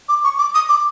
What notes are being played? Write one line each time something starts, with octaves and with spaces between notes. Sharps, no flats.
D6
C#6
D6
D#6
D6